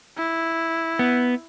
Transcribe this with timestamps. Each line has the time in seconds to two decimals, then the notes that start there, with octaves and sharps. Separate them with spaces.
0.17 E4
0.99 B3